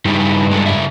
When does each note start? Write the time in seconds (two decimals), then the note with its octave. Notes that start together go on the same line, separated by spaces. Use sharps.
0.05 G2 C#3 D#4 E4
0.51 G#3 D4 A4
0.66 C#3 E4 E5